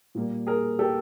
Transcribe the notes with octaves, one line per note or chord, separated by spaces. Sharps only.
A#2 G3 A#3
G#4 A#4
G4 A4